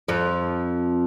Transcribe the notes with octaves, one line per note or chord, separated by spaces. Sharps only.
F2 F3